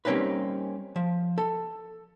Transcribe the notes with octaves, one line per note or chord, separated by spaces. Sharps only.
G3 A#3 C4 C#4 D#4 B4
F3
A4